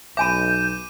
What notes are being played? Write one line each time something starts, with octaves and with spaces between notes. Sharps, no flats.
B1 E5 G#5 B5 D6 G6 D#7